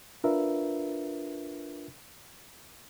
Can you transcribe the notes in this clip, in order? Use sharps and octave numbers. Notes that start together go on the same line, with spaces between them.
D4 F4 A#4 B4 E5